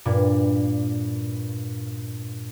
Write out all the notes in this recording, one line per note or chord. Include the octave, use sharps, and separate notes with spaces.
G2 A#2